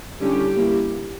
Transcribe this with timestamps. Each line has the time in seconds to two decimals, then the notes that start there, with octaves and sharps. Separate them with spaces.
0.19 D3 G3 C#4 E4 G4
0.57 G3 A#3 E4